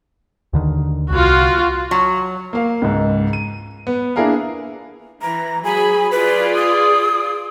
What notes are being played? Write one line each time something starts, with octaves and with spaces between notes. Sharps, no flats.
D#2 D3 D#3
C2 F4 F#4
F#3
A#3 F5
C#2 G#2
D#7
B3
A#3 D4 E4 G#4 A#4 F5
E3 A#5
F#3 G#4 G#5 B5
F4 G#4 B4 D5
D#6